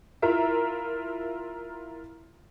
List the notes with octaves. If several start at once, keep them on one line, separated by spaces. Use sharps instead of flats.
E4 F4 A#4 E5 A#5